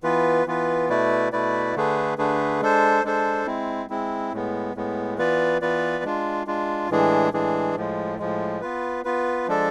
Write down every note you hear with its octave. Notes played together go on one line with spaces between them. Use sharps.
E3 B3 F4 B4
E3 B3 F4 B4
B2 A3 E4 B4 D5
B2 A3 E4 B4 D5
D3 A3 D4 G#4 B4
D3 A3 D4 G#4 B4
G#3 D4 A4 C5
G#3 D4 A4 C5
G#3 C4 E4
G#3 C4 E4
A2 G#3 B3
A2 G#3 B3
E3 B3 F4 B4 D5
E3 B3 F4 B4 D5
G#3 D4 F4
G#3 D4 F4
A2 E3 G#3 D4 G#4
A2 E3 G#3 D4 G#4
A2 F3 G#3
A2 F3 G#3
B3 F4 B4
B3 F4 B4
F3 G#3 D4 A4 D5